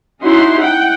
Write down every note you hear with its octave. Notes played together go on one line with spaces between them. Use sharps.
C#4 D#4 E4 F#4 C6
F#5 G5